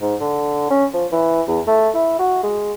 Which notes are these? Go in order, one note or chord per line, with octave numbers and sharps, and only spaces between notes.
G#2
D3
C#4
F3
E3
E2
A3
E4
F#4
G#3